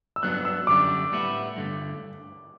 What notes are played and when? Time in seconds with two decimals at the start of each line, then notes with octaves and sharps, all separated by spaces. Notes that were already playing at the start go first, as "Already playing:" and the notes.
0.16 E6
0.23 G2 F#3 B3 D4 F#6
0.45 E6
0.67 F#2 D3 G3 D4 D6
1.12 A2 G3 B3 E4
1.57 G2 D3 A3